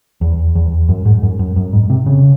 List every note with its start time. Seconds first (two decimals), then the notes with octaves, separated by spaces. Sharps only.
0.21 E2
0.55 E2
0.89 F#2
1.05 G#2
1.23 F#2
1.39 F#2
1.56 F#2
1.73 G#2
1.90 C3
2.06 C#3